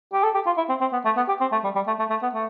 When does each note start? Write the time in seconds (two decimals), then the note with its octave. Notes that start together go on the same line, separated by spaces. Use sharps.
0.13 G4
0.23 A4
0.34 G4
0.46 F4
0.57 E4
0.69 C4
0.81 C4
0.93 B3
1.05 A3
1.17 B3
1.28 G4
1.41 C4
1.52 A3
1.64 G3
1.75 G3
1.87 A3
1.99 A3
2.10 A3
2.22 B3
2.34 A3